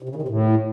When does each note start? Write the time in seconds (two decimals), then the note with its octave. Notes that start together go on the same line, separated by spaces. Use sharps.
0.02 C3
0.09 C#3
0.15 D#3
0.22 C3
0.28 A2